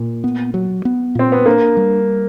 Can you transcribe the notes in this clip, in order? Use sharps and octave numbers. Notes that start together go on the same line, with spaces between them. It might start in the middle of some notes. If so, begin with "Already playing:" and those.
Already playing: A#2
B3
F#3
B3
A#2 C4
B3
A#3 D4
G3